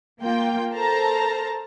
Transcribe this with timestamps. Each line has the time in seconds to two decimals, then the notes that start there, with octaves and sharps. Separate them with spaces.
0.22 A#3 F4 G5
0.72 A4 A#4 C5 A5 A#5